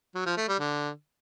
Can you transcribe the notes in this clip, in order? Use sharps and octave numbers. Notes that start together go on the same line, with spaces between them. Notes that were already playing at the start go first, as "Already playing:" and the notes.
F#3
F3
A3
G3
D3